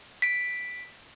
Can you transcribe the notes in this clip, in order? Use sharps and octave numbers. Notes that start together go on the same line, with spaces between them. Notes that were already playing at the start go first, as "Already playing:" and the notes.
B6 D7